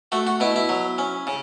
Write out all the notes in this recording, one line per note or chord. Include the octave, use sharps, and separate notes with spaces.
A3 F#4
F#4
B2 E4
E4
F#3
C#4
C#3